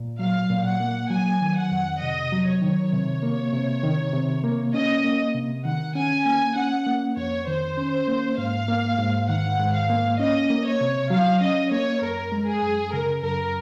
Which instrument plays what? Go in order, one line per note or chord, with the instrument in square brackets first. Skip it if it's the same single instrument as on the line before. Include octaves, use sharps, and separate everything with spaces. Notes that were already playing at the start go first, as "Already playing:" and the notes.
Already playing: [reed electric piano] A#2
[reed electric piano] F#3 [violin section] F5
[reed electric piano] A#2
[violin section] F#5
[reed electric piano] A#3
[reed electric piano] F#3 [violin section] G#5
[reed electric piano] D#3
[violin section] F#5
[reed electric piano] F2
[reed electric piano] C3 [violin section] D#5
[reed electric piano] F#3
[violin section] C#5
[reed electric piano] D#3
C3
A#3
C3
D#3
C3
A#3
[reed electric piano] C#4 [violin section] D#5
[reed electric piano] A#3
C3
[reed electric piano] D#3 [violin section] F#5
[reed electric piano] C#4 [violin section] G#5
[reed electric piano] A#3 [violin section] G#5
[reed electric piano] C#4 [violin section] F#5
[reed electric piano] A#3
[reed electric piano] F2 [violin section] C#5
[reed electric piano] D#3 [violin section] C5
[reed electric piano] C#4
A#3
[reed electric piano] G#2 [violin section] F5
[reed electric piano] A#3
G#2
[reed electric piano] D#3 [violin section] F#5
[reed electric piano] G#2
[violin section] F5
[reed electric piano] A#3
[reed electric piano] C#4 [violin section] D#5
[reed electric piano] A#3
[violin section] C#5
[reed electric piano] C3
[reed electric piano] F#3 [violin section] F5
[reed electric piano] C#4 [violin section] D#5
[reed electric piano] A#3 [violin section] C#5
[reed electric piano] F#2 [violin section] A#4
[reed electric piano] G#3
[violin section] G#4
[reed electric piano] F#2
[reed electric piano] C#3 [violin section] A#4
[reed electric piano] F#2 [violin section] A#4